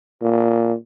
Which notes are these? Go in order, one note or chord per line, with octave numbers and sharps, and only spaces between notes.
A#2